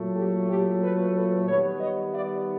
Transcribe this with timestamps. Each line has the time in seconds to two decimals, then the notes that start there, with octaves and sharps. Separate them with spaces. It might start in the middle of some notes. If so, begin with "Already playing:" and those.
Already playing: A#2 F#3 A3
0.15 G4 A4
0.48 G4 A4
0.81 A4 B4
1.14 A4 B4
1.47 D#3 G3 B3 B4 C#5
1.80 C#5 D#5
2.13 D5 E5